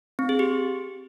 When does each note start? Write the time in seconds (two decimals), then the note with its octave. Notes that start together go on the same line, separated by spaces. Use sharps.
0.19 C4
0.29 G#4
0.39 G4